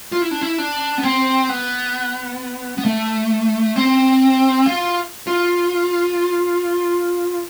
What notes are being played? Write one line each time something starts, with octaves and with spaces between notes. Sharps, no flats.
F4
E4
D4
E4
D4
B3
C4
B3
B3
A3
C4
F4
F4